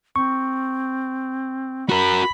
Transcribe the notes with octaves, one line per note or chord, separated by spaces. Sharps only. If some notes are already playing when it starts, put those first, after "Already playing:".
C4 C#6
F#4 A#4 B5